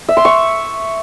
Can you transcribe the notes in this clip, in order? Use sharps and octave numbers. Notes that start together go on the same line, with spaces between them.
E5
C6
C#6